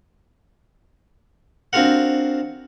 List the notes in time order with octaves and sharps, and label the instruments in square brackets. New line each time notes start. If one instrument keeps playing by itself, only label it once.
[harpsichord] C4 D4 F4 F#4 A#4 F#5